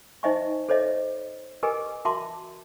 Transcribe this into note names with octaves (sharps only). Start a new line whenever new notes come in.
D#4 C5 D#5 E5 G#5 C#6
A4 C5 C#5 D#5 E5
G4 G#4 A#4 B4 D#5 G#5
F#4 A#4 E5 A5 C6 D6